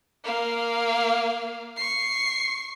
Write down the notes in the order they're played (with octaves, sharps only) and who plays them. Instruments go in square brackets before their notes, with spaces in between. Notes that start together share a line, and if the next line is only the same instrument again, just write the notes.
[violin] A#3 F5
C#6 C7